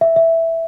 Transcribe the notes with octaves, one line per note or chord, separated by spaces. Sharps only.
E5
E5